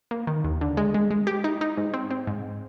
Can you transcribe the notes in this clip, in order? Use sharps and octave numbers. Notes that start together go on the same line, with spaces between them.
A#3
D#3
D#2
D3
G#3
G#3
G#3
G4
D#4
D#4
G#2
C4
C4
G#2